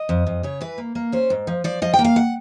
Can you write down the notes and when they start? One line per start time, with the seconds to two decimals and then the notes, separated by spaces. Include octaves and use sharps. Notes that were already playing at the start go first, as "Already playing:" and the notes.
Already playing: D#5
0.09 F2
0.27 F2
0.43 C#3 C#5
0.61 E3 B4
0.78 A#3
0.95 A#3
1.12 C#4 C5
1.30 G#2
1.47 F3
1.64 F3 D5
1.82 F3 D#5
1.94 G5
1.99 A#3
2.04 F5
2.16 F#5